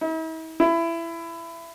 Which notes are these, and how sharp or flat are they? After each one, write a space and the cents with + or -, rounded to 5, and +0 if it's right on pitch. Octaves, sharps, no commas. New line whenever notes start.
E4 -45
E4 +20